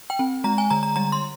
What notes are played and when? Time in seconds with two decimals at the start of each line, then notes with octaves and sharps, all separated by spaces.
0.10 G5
0.19 C4
0.44 G#3 A#5
0.58 G#5
0.70 D3 A#5
0.83 A#5
0.96 G3 A#5
1.12 C6